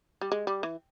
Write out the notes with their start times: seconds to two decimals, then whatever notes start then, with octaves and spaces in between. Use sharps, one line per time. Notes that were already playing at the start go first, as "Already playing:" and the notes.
0.21 G3
0.32 G#3
0.47 G3
0.63 E3